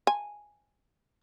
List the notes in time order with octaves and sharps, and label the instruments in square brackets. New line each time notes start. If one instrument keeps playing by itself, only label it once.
[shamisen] G#5